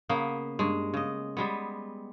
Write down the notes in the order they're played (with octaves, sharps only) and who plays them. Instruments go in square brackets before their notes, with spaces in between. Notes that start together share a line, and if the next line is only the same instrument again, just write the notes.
[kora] C#3 A#3 B3
G2 G#3
C#3 D#5
G3 G#3 B3